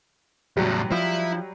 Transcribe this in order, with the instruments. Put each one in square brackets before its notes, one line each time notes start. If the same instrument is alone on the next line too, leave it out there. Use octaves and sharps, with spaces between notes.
[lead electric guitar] E2 A2 [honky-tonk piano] F#3 G3
[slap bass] F3 [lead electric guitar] E4